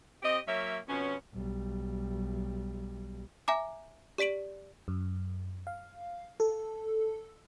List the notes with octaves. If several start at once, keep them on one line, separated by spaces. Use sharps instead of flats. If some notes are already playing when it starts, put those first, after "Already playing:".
C4 G4 D#5
F#3 A#3 C#4 E5
F2 B2 B3 C#4
B1 G3
E5 G#5 A#5 D6
G4 D5 B6 D7 F#7
F#2
F5
A4